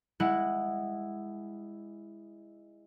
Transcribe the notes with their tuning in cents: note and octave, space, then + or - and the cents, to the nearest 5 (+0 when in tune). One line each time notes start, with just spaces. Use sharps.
G#3 -20 E4 +0 F#5 +0